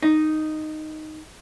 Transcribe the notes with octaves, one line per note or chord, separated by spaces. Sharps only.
D#4